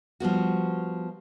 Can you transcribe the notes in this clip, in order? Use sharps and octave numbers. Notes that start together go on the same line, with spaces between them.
F3 G3 B3 F#4